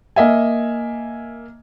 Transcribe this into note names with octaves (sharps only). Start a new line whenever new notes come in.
A#3 D#5 E5 G#5